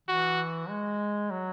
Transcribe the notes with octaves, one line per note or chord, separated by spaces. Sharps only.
E3 F#4
G#3
F#3